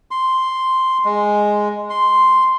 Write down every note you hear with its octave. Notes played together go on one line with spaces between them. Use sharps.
C6
G#3
C6